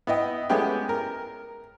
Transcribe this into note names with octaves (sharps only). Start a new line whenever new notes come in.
B3 E4 D#5 G5
G#3 A3 B3 C#4 G4 G5
A#4